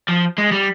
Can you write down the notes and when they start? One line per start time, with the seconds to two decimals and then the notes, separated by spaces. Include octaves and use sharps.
0.08 F3
0.38 G#3
0.52 G3